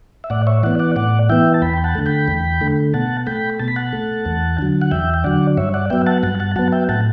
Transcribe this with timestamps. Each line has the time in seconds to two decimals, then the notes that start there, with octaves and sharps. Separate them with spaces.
0.24 E5
0.30 A2 D5 F#5
0.47 C#5 E5
0.63 E3 B3 D5 F#5
0.79 D5 F#5
0.96 A2 D5 F#5
1.29 E3 B3 E5 G5
1.54 A5
1.62 E2 G5 B5
1.73 G5
1.84 F#5 A5
1.95 D3 A3
2.06 G5 B5
2.28 E2
2.61 D3 A3
2.94 B2 F#5 A5
3.26 A3 G5 B5
3.60 B2 A5
3.68 B5
3.76 F#5 A5
3.93 A3
4.26 E2
4.58 D3 F#3
4.82 F#5
4.91 E2 E5 G5
5.14 G5
5.24 D3 F#3 D5 F#5
5.57 G2 C#5 E5
5.74 D5 F#5
5.90 F#3 B3 E5 G5
6.07 F#5 A5
6.23 G2 F#5 A5
6.40 F#5 A5
6.56 F#3 B3 F#5 A5
6.72 E5 G5
6.89 A2 F#5 A5